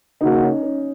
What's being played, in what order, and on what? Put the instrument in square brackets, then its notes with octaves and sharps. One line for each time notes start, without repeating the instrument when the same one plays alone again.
[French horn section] C#3 A#3 F#4 [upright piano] D#4
[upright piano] C#4
C#4